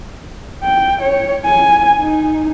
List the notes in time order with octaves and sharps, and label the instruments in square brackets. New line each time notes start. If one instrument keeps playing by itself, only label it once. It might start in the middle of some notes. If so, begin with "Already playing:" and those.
[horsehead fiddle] G5
C#5
G#5
D#4